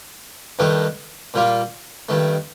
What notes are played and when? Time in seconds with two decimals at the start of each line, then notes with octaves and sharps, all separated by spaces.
0.59 G2 D#3 A3 D#4
1.34 A#2 G3 A#3 F4
2.09 G2 D#3 A3